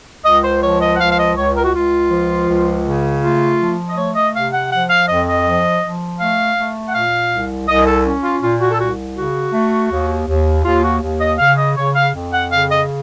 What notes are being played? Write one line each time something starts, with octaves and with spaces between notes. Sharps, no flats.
C#2 D#5
C5
F3 C#5
D#5
F#5
C#2 F5
F5
D#5
C#2 C#5
A#4
F#4
C#2 F4
F3
C#2
C#3
A3 F4
F3
D#5
A3 C#5
D#5
C3 F5
F#5
F3 F#5
F5
F2 D#5
D#5
F3
F3
A3 F5
A3
F#5
A#2 F5
C2
C2 D#5
A4
C#4
F4
A#2 F4
F#4
A4
C2 F#4
C#3 F#4
A3
D#2
D#2
D#2 F4
F#4
D#2
D#5
C#3 F5
D#5
C#3 C#5
F5
F2
F#5
C#3 F5
D#5